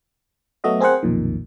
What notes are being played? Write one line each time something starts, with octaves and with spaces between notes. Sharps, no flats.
F#3 A3 B3 F#4 D#5 E5
C4 G#4 A#4 C5 F#5
B1 F2 A#2 D#3